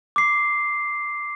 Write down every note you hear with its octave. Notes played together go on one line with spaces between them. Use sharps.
D6 C7